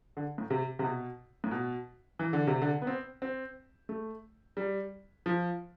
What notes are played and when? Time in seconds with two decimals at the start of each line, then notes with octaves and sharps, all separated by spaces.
0.17 D3
0.38 A2
0.50 C3
0.79 C3
0.84 B2
1.44 A2
1.51 B2
2.19 E3
2.33 D3
2.47 C3
2.61 D3
2.82 B3
2.87 C4
3.22 C4
3.89 A3
4.57 G3
5.26 F3